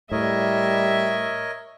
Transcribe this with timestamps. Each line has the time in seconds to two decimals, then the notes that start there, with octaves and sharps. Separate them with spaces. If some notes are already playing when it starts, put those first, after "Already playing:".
0.12 A2 G3 A#4 C#5 D#5 E5